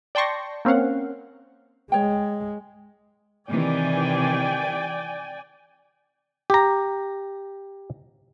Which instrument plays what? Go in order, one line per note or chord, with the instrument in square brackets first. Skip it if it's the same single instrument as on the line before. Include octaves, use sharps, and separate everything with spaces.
[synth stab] D5 G5 A5 C6 C#6 A#6
A#3 C4 C#4 F5 F#5
[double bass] G#3 [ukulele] C#5 G5
[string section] C3 D#3 E3 [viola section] D5 G5 G#5
[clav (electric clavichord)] G4 A#5